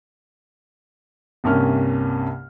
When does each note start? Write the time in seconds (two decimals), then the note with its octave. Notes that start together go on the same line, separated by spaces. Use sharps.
1.44 C2 G2 C3 A#3 C#4 F6